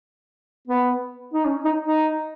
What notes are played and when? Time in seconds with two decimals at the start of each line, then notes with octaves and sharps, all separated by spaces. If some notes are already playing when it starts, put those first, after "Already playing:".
0.67 B3
1.34 D#4
1.45 C#4
1.64 D#4
1.84 D#4